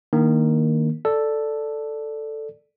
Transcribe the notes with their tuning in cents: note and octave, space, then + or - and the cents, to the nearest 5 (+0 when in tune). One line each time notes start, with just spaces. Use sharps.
D#3 +0 A#3 +0 D4 +0
A4 +0 D5 +0